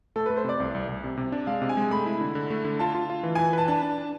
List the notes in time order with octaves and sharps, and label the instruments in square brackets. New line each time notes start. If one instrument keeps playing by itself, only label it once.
[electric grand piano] A3 [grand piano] A4
[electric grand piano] A3 [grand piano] B4
[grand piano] C5
[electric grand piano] C3 [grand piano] D5
[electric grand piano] C2
C2
C2
C3
C3
D4
[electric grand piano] G#3 [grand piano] F5
[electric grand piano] C3
[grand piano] G#5
[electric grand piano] G#3
[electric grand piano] A3 [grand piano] B5
[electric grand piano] E4
D3
D3
A3
D3
[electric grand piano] F4 [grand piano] A5
[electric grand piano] F4
F4
E3
[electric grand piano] E3 [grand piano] G#5
[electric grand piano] B4 [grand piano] A5
[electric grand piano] D4 [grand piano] A5
[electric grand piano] D4
D4